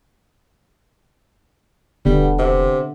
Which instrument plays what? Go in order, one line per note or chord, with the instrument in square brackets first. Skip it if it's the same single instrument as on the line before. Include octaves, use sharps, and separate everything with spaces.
[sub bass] E1 [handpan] D3 B3 [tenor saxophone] G3
[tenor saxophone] C3